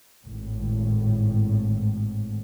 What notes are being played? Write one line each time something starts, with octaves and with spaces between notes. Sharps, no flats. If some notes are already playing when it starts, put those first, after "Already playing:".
G#1 A2